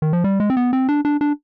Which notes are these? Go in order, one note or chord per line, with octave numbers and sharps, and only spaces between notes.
D#3
F3
G3
G#3
C4
B3
C4
D4
D4
D4